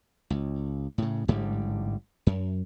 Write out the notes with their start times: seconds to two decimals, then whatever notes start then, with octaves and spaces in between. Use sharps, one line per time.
0.30 C#2
0.98 A2 C#3
1.28 A1 G#2 D3 G3
2.27 F#2